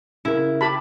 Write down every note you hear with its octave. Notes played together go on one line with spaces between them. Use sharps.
C#3 E4 A#4
G4 A5 B5